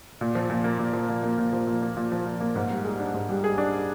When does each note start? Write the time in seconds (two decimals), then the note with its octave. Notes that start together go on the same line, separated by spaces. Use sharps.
0.21 A#2
0.35 F3
0.50 A#2
0.64 A#3
0.79 A#2
0.93 F3
1.09 A#2
1.23 A#3
1.38 A#2
1.53 F3
1.67 A#2
1.82 A#3
1.97 A#2
2.12 F3
2.26 A#2
2.41 A#3
2.56 G#2
2.70 G3
2.85 G#4
2.99 D4
3.14 G#2
3.29 G3
3.44 G#4
3.58 D4